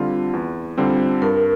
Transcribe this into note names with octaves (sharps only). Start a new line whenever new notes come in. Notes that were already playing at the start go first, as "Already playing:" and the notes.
Already playing: D3 G3 C4 F4
E2
D3 G3 C4 F4
G2 A#4